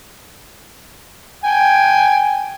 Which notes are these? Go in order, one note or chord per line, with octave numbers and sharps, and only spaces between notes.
G5 G#5